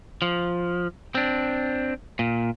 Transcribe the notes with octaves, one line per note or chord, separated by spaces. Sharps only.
F3
C4 D4
A#2